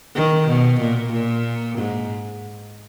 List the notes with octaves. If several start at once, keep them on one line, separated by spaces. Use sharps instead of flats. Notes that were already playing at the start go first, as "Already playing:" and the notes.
D#3
B2
A#2
A#2
G#2